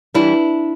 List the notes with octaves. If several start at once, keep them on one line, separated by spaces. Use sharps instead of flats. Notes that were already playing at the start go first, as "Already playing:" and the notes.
E3 G3 D4 E4